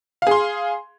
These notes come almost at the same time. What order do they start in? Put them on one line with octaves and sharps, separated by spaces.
F5 G#4 C6